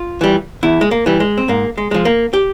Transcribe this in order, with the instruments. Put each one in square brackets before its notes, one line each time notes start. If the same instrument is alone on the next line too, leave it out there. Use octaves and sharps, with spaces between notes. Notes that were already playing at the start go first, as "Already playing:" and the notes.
Already playing: [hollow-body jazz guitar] F4
E3 G3
E2 E4
G#3
A#3
E3 G3
G#3
C4
G#2 A#3
G#3
F3 G#3
A#3
G4